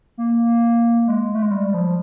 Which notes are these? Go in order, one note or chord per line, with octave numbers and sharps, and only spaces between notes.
A#3
G#3
A3
G#3
G3
F3